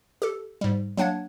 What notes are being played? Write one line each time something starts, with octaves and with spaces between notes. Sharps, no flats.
G4 A4
G#2 G3
F#3 A#3 D4 F#5 A5 G#6